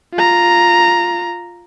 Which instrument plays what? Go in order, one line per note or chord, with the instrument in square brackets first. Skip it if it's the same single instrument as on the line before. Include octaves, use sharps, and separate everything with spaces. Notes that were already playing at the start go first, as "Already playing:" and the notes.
[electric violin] F4 A#5